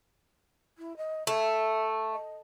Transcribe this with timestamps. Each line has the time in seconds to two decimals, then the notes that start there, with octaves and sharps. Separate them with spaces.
0.78 E4
0.97 D#5
1.27 A3 E5
2.12 D#5